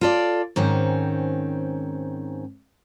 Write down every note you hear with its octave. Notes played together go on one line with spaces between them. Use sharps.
F4 A4 D5
G#2 D#3 C4 C#4